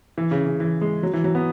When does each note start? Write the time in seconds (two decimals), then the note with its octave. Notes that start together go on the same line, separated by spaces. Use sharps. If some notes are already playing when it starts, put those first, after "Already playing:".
0.18 E3
0.31 C#3
0.46 C#3
0.60 E3
0.81 G#3
1.03 F#3
1.14 E3
1.24 F#3
1.35 B3